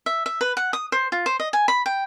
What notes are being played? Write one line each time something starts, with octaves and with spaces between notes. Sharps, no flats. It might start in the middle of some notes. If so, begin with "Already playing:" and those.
E5
E5
B4
F#5
D#6
C5
F4
C5
D#5
G#5
B5
G5